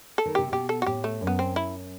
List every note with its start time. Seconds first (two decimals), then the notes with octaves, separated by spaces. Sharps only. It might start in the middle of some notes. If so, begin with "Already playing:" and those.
0.18 A4
0.26 D#3
0.35 C3 G4
0.52 B2 G4
0.69 A4
0.82 F#4
0.86 A2 G4
1.04 A3
1.21 F#2
1.27 B3
1.39 C4
1.56 E4